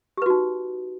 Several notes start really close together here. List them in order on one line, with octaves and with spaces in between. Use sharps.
G4 B4 F#4 D#4